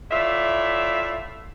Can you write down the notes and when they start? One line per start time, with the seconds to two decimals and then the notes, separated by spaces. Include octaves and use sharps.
0.11 A2 F4 D5 E5